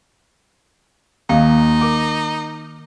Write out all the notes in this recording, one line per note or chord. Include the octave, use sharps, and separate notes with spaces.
D#2 D#3 A#3 D#4 F5
A#4 D6